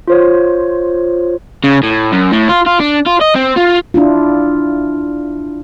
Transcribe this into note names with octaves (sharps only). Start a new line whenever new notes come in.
F4 C5 C#5
C#3
A2
F#2
A2
F4
F4
D4
F4
D#5
C4
F4
D4 E4 F4